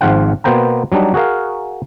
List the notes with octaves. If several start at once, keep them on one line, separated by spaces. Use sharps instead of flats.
G#1 G#2 F3 F4 F#5 G5
B2 A#3 B3 C5 G5 A#5
F#3 G3 D4 D#4
F#4 G#4 A#4 F5